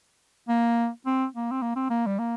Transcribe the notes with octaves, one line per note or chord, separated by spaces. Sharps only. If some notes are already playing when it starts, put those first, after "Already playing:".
A#3
C4
A#3
C4
A#3
C4
A#3
G3
A#3